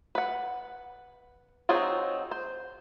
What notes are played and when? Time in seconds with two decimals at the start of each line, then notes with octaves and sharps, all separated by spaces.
0.15 B4 F#5
1.69 F#3 C4 D#4 F4 G#4
2.31 C5